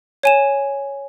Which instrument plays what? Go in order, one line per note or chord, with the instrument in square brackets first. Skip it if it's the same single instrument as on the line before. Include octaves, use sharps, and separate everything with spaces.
[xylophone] C#5 G#5 E7